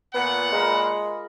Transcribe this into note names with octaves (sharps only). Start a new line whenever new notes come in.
A#2 B3 F#5
G#3 F4 A#4 B5